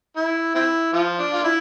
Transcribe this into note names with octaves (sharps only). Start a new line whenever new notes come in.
E4
C4 E4
F3 F4
D4
F4
E4